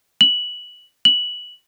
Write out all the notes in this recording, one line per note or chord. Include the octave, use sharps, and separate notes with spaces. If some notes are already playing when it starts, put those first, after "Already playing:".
F#7
F#7